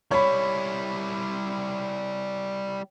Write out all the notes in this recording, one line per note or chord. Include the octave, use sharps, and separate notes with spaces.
G3 E4 C#5 B5